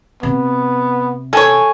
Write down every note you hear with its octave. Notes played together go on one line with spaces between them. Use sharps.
C3 B3
A4 C#5 G#5